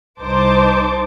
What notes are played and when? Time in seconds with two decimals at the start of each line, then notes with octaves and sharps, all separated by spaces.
0.21 C2 D#4 C5 A5 D6